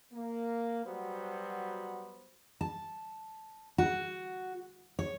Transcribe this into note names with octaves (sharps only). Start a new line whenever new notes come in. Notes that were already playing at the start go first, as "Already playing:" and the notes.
A#3
F#3 G3 B3 F#4 C5
A5
F#4
C#5